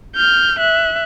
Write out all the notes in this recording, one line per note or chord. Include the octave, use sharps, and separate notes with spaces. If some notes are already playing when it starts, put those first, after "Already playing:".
F6 G6
E5 F#6